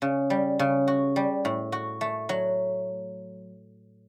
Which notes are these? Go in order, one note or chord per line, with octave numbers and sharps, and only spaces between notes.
C#3
G3
C#3
F#4
G3
A2
F#4
A3
F#3